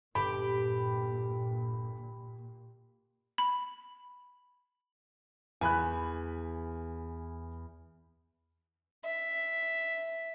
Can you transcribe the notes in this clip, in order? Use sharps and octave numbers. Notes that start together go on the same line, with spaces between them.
G1 A#2 G4 B5
B5
E2 G#5 B5 F#6
E5